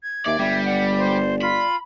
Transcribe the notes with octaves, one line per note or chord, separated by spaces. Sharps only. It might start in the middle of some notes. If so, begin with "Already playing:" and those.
G#6
D#2 D5 E5
G1 G3 E5
D5 F#5
C5
F4 B5